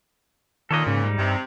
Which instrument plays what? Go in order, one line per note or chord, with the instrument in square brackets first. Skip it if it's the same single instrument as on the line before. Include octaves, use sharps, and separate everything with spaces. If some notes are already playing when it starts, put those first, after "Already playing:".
[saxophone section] A#2 [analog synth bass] D#3 [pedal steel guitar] A4 C#5 D#5
[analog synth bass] G#2 [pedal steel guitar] C#3
[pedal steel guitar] G3 D#4
[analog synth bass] G2 [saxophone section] C3